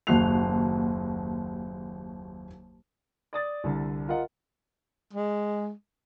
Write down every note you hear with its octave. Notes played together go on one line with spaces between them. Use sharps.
F#1 D#2 F#4 F#6 C7 F7
D5 D#6 A6
C2 D3
F4 A#4 D#5 F#5
G#3